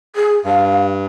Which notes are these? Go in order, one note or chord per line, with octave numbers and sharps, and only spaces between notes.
G#4
G2 F5